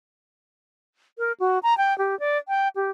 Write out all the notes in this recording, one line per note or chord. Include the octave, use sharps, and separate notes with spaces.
A#4
F#4
A#5
G5
G4
D5
G5
G4